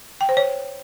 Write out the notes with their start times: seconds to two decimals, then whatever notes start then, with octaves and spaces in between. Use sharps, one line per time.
0.21 G5
0.29 C5
0.37 C#5